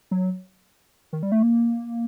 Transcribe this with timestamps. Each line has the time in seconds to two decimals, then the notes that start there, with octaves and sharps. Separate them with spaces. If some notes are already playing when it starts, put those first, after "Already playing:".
0.11 F#3
1.13 D#3
1.23 G3
1.32 A3
1.42 A#3